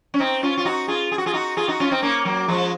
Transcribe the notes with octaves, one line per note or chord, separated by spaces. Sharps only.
C#4
C4 D#4
C#4 F4
F4
D#4 F#4
F4 G#4
G#4
F#4
F4 G#4
D#4 F#4
F4 G#4
D#4 F#4
C#4 F4
C4 D#4
A#3 C#4
F#3 A#3
F3 G#3